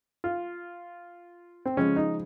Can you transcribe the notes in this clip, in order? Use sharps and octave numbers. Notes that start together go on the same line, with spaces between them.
F4
C4
C#3 F3 G#3 C#4
D#4